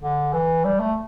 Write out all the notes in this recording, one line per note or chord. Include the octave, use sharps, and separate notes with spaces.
D3
E3
G3
A3